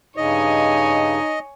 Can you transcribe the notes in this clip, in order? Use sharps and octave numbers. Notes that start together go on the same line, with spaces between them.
G2 C#3 D#4 C#5 D#5 G#5